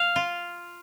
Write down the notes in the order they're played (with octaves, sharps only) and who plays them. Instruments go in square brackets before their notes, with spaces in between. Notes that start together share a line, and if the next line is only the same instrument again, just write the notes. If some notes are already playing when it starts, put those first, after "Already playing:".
Already playing: [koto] F5
F4